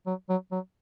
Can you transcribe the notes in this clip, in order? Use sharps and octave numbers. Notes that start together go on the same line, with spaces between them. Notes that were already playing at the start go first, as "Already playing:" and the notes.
F#3
F#3
F#3